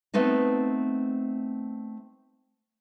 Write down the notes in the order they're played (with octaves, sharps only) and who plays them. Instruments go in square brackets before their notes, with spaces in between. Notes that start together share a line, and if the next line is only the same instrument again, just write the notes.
[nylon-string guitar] A3 B3 C4 D#4